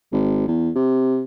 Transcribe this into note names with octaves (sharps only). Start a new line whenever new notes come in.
G#1
E2
C3